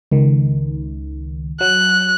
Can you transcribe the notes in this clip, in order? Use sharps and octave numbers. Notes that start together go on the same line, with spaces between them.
C#2 D#3
F#3 F#6